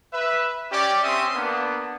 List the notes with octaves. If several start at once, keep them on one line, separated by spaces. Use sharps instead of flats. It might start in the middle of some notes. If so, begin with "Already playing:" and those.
B4 E5
C#4 G4 D5
C4 C#4 G4 E5 C6 D#6
A#3 B3 D4